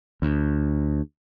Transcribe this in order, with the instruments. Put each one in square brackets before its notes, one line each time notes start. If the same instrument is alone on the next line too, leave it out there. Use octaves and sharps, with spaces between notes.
[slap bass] D2